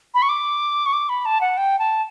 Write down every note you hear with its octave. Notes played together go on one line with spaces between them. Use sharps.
B5
C#6
D6
C#6
D6
B5
A5
F#5
G5
A5